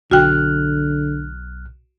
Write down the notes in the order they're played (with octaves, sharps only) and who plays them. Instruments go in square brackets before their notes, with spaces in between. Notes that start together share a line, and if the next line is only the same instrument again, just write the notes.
[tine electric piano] B1 F6 F#6 [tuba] D3 [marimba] F#4 G5